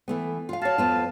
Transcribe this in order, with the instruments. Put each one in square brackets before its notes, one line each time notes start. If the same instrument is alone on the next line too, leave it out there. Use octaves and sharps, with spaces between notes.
[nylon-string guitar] E3 A3 B3
F4 F5
[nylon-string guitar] F#4 C#5 [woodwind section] F5 A5
[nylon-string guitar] F2 B3 F4